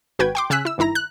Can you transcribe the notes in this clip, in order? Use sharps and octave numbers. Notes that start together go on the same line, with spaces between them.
G#1 F#4 B4 G5 G#6
G5 C6 D6
C#3 G#5 E6 F#6 B6
E4 E6
G1 D#3 E4 A#5 A#6
F#6